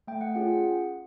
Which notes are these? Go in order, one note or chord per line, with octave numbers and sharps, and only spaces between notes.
A3 G5
F#5
C#4 F4 G#4 G5
F#5